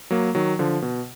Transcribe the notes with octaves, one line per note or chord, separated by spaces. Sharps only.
F#3 A#3
D#3 F#3
D3 F3
B2